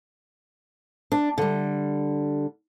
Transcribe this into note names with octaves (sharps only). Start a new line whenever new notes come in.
D4
D3 G3